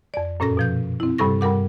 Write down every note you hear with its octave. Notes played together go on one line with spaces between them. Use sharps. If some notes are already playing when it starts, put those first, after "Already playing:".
F2 D5
F#2 A#2 C#4 A4 A#6
B2 F3 G6
C4 E4
G2 C3 G3 A4 C#6 A#6
G2 G3 A#4 F#5 D6